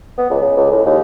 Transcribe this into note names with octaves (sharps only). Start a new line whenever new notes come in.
B3
C#2
C#3
C#2
A2
D#2